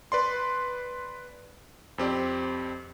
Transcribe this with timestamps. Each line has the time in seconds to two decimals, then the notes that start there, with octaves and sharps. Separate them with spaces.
0.12 B4 D5 C6
1.98 F2 C4 G4 D5